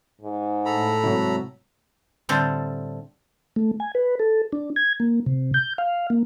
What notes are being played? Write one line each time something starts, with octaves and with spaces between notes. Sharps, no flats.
G#2
A2 A4 A#5 B5
G#2 C3 F#3 E4
A2 D3 G3 C4 A4
A3
G#5
B4
A4
D4
G#6
A#3
C3
G6
F5
A#3